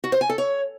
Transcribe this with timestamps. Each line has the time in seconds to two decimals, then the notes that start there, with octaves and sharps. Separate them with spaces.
0.04 F#4
0.12 C5
0.21 G#5
0.29 A4
0.38 C#5